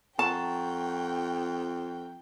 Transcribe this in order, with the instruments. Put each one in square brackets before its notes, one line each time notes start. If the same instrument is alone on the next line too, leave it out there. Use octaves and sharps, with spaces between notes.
[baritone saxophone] F2 [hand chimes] F#5 A#5 C#6 [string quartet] G5 [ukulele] A5